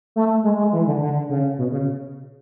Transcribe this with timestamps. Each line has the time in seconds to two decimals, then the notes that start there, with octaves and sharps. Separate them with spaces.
0.16 A3
0.44 G#3
0.58 G#3
0.73 E3
0.87 D3
1.01 D3
1.30 C#3
1.58 B2
1.72 C#3